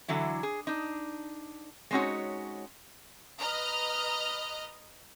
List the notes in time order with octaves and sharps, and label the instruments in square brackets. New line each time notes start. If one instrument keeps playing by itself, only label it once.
[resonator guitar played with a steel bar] D3 E3 F#3 E4
G#4
D4 D#4
G#3 C4 C#4 D#4 F#4 C#5
[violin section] B4 D#5 A#5 F6